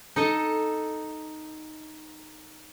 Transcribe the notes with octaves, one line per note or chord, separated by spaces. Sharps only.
D#4 A4 D#5